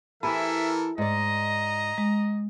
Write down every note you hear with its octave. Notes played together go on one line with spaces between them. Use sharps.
E3 E4 G4 A4 A#4 E5 G#5 B5
G#2 D5 D#5 A#5
G#3